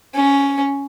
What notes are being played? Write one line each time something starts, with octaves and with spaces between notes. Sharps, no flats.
C#4